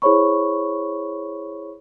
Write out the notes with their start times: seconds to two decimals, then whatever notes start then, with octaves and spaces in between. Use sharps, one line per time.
0.02 E4 G#4 C5 C#5 B5 C#6